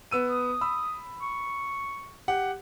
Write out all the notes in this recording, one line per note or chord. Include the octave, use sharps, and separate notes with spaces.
B3 E6 D#7
D#6
B5 E6
C#6
G4 F#5